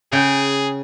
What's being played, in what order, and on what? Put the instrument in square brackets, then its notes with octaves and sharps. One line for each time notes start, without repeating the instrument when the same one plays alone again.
[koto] C#3 G5 [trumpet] G#4